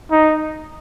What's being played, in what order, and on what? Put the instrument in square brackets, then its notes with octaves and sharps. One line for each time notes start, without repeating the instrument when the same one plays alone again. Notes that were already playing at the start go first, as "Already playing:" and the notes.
[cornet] D#4